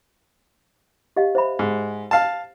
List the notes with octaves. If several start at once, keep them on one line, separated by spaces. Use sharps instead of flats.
G4 D#5 F5
C5 E5 B5
G#2
F5 A5